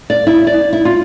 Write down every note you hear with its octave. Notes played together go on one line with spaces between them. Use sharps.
D5
E4
D5
E4
F4